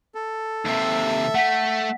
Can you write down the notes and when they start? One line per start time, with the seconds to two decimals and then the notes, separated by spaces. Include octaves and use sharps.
0.15 A4
0.65 D#2 C3 E5
1.35 A3 F#5 B6